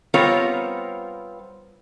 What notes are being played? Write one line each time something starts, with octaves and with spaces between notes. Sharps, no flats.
G3 B3 C4 F4 A#4 C#5